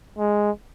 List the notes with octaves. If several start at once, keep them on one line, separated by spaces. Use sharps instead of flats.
G#3